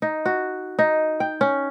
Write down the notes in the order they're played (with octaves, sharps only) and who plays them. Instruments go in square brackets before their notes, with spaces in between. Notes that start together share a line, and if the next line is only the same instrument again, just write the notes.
[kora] D#4
F#4
D#4
G5
C#4